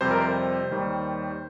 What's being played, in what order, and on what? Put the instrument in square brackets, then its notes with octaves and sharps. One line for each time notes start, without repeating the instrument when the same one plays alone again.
[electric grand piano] F2 C3 G3 C5
A#4
C5
D#2 D#3 G3